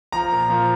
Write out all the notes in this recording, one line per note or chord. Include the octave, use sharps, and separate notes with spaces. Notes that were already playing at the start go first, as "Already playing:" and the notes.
F3 A#5
A#2
F3